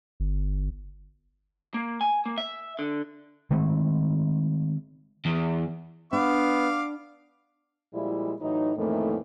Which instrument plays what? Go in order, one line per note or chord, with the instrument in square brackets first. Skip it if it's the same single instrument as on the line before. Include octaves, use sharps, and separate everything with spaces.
[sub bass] G1
[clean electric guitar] A#3
G#5
A#3
E5
D3
[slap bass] D#3 G#3 A3 C4
[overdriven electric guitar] E2
[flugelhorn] B3 [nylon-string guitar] D4 [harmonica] F5 D6
[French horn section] A#2 F3 G3 G#3 E4
A2 E3 F#3 D#4
F2 A2 D#3 E3 A3 A#3